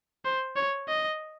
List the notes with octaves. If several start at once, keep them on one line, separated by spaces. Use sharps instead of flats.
C5
C#5
D#5